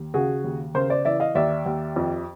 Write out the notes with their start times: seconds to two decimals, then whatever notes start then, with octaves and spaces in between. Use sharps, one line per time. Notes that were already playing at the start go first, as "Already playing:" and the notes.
Already playing: D#2
0.14 C#3 F#4 G#4
0.44 D#2
0.74 C#3 A#4 C5
0.90 C5 D5
1.05 E3 D5 E5
1.20 D#5 F5
1.35 D#2 D5 E5
1.66 D#2
1.96 F2